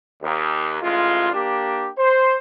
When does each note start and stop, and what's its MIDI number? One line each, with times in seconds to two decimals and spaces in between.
0.22 0.76 39
0.81 1.30 33
0.81 1.30 56
0.81 1.30 65
1.32 1.89 58
1.32 1.89 62
1.32 1.89 67
1.97 2.34 72